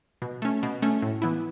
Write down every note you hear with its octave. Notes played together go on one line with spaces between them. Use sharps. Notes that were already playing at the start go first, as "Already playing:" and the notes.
B2
A3 C#4
B2
A3 C#4
A2
E3 B3 E4